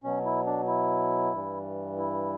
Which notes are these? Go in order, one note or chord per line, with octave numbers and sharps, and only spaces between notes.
B2 F#3 C#4
E4
D4
E4
G2 E3 G3
E4